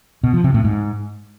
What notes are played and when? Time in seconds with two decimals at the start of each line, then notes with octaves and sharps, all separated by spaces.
0.23 B2
0.34 F3
0.44 C3
0.54 A2
0.65 G#2